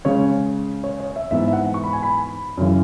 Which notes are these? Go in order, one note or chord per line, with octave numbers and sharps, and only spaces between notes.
C#3 G#3 C#4 C#5
C#5
C#5
E5
G#2 E3 B3 E5
E5
F#5
C#6
B5
G#5
B5
F#2 C#3 E3